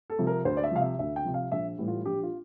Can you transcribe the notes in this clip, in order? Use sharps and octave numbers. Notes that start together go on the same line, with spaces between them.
A4
C3 F3
A#4
D2 C5
D5
E5
C3 F3 F5
E5
D2 E5
G5
C3 F3
F5
A#1 E5
A2 E3 G3
F4
A#1 G4
F4